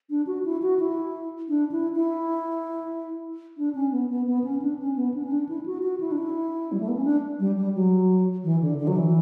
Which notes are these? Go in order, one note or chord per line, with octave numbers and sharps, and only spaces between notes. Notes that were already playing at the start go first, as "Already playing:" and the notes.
D4
F#4
E4
F#4
E4
D4
E4
E4
D4
C#4
B3
B3
B3
C#4
D4
C#4
B3
D4
C#4
D4
E4
F#4
F#4
E4
D4
E4
G3
A3
B3
C#4
D4
G3
G3
F#3
E3
D3
D3
F#3
E3